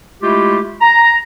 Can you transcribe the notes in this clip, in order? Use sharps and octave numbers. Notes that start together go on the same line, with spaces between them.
G#3 A3 E4 F4 G4
A#5